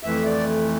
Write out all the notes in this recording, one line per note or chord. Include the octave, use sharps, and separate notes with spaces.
F2 E3 A3 E5
D5